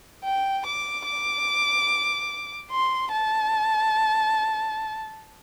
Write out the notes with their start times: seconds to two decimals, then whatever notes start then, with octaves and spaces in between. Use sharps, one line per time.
0.24 G5
0.66 D6
1.06 D6
2.71 C6
3.12 A5